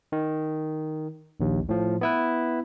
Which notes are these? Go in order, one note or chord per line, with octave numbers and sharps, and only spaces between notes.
D#3
A#1 D#2
A2 F3
B3 E4 B4